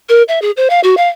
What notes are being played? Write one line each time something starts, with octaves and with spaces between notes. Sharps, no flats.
A#4
E5
G#4
C5
F5
F#4
F5